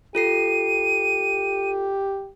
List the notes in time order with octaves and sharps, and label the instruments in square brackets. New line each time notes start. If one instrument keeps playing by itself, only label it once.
[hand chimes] F4 A4 C7 [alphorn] G4 [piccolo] D#7